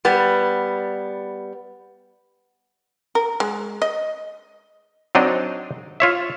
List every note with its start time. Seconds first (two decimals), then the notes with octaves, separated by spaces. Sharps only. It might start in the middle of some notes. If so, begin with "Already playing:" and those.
0.05 G3 B3
3.15 A#4
3.40 G#3
3.82 D#5
5.15 F#3 C4 D4 D#4 D#5
6.00 F4 C#5 E5